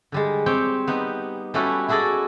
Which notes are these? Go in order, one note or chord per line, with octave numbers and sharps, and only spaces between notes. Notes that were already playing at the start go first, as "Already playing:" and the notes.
D3 G3 G#3
C4 G4 C#5 G5
B3 D#4 G4
G3 A3 C#4 E4 F#4
E4 F#4 G#4 A4 D5 D#5